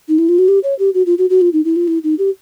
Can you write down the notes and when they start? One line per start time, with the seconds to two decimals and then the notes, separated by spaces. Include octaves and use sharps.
0.09 D#4
0.18 E4
0.29 F4
0.38 F#4
0.48 G4
0.64 C#5
0.79 G4
0.94 F#4
1.06 F4
1.18 F#4
1.30 F#4
1.41 F4
1.53 D#4
1.65 E4
1.76 F4
1.88 E4
2.04 D#4
2.19 G4